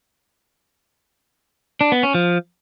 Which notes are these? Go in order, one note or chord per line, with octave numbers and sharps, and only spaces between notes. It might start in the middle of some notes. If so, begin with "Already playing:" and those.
D4
B3
C#4
F3